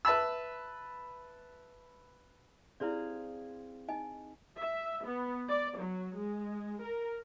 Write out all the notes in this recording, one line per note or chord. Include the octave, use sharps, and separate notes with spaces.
B4 E5 A5 B5 E6
C4 E4 G#4 D5 F5
D#4 D#5 G#5
E5
B3
D5
F#3
G#3
A#4